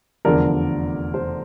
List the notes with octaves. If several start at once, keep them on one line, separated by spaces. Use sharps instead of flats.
F1 E2 D3 F3 A#4 D5
A4 C5